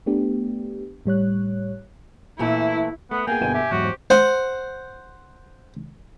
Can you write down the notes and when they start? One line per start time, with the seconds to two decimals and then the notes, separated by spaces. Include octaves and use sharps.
0.06 A3 B3 D4 G4
1.06 A2 G3 C#5 F#6
2.39 A#2 E3 A3 E4
3.11 A3 B3 F#5
3.27 A#3 B3 G#4 G5 G#5
3.41 G1 B2 D#7
3.54 G4 E5
3.71 E2 G#2 F#3 F#4
3.83 C5
4.10 C5 F#5